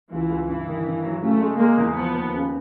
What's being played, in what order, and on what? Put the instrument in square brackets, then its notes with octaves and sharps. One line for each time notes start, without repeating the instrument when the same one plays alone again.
[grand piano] C#2 [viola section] E3
[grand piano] C#2
[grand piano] G2 [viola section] E3
[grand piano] D#3
G2
F#3
[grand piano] C#3 [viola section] A3
[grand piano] G#3
[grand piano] G#3 [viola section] A#3
[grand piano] E2
[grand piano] F3 [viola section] B3
[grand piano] D#2
C#3